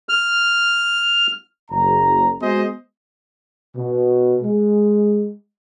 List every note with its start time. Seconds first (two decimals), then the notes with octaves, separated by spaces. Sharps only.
0.09 F6
1.71 F#1 A#5
2.42 G#3 B3 F#4 G#4 C5 D#5
3.76 B2
4.43 G#3